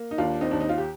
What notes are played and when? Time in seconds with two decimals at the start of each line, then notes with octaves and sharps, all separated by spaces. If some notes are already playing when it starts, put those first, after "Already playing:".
Already playing: A#3
0.11 D#4
0.18 D#2 D4 F4
0.41 C4 D#4
0.51 D#2 D4
0.60 D#4
0.69 F4
0.78 G4